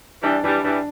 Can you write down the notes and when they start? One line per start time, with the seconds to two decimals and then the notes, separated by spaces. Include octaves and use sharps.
0.22 E3 G3 D4
0.44 E3 G3 D4
0.64 E3 G3 D4